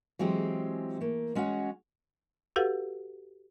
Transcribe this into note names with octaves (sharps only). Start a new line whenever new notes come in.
E3 F#3 G#3 C4 G4
A3 A#3
G#3 C#4 F#4 C#5 F#5
F#4 G4 A4 B4 F5 F#5